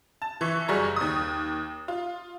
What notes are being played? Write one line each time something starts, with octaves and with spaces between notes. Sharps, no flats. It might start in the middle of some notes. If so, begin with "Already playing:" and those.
A5
E3 E5 C#6
F#1 F#3 G3 G#4 A#5 C#6
D#2 D#6
F4